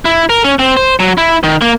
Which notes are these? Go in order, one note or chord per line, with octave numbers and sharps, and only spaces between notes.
E4
A#4
C#4
C4
C5
F#3
E4
D#3
A#3